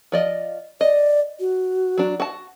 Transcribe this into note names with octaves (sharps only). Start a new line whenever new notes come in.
F3 D5 D#5
D5 D#5
F#4
F#3 D4
F#4 A5